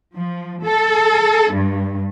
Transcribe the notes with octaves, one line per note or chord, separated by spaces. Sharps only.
F3
A4
G2